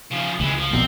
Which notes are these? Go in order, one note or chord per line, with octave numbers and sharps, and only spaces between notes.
C#3 F3
C#2 E3 G#3
F3
A#1 B2 C4